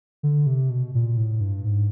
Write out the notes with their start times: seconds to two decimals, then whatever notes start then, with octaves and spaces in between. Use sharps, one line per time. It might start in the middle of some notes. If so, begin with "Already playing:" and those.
0.23 D3
0.47 C3
0.70 B2
0.95 A#2
1.18 A2
1.41 G2
1.65 G#2